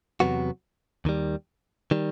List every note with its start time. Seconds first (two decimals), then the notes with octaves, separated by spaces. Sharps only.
0.20 E2 C3 F#3 B3 F#4
1.05 D#2 D#3 G3
1.91 D#3 G3